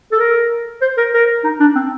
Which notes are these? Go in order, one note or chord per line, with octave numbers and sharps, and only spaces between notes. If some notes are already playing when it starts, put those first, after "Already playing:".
A4
A#4
C5
A#4
A#4
D#4
D4
C4